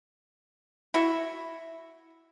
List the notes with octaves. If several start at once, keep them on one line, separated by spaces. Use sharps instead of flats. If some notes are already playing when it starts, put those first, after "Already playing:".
E4 F#4 E5